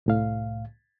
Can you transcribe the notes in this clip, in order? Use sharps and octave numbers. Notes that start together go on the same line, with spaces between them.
C2 A2 F5